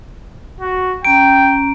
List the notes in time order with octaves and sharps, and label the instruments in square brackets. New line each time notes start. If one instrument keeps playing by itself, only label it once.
[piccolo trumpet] F#4
[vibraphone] C#4 A#5 [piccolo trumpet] G5 [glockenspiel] D7